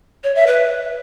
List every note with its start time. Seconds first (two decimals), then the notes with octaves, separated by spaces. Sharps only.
0.24 C#5
0.35 E5
0.47 B4